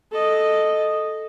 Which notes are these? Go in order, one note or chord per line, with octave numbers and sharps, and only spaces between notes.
A4 D#5